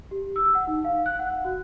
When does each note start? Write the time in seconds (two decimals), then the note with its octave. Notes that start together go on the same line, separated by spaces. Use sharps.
0.11 G4
0.36 E6
0.55 F#5
0.67 D#4
0.85 F5
1.06 F#6
1.19 F#5
1.44 F#4